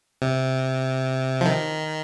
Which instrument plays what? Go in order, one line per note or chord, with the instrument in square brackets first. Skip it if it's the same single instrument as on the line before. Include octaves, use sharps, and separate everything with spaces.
[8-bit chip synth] C3
F3
D#3